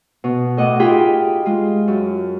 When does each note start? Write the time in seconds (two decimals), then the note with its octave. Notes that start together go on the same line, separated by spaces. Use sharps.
0.24 B2
0.57 A2 D#5 F#5 D6
0.80 D#4 F4 G4 G#4 G5 B5
1.46 G#3 F4
1.88 F#2